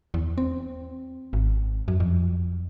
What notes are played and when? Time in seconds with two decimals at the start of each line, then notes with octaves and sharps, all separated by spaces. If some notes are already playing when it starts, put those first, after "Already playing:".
0.14 E2
0.38 C4
1.33 G#1
1.88 F#2
2.00 F2